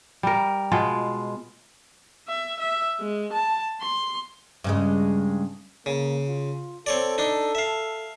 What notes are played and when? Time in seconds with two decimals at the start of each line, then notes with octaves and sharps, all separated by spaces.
0.23 G3 A#4
0.71 B2 G#3 F4
2.28 E5
2.59 E5
3.01 G#3
3.32 A5
3.81 C6
4.64 G2 C#3 G#3
5.86 C#3 A#3
6.28 F4
6.86 C4 A4 C#5 D5
7.18 D4 D#4
7.55 E5 F5